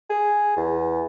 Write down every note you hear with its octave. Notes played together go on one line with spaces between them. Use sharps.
G#4
E2